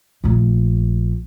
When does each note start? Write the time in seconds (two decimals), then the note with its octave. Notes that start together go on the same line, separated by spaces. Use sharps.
0.24 A#1 A3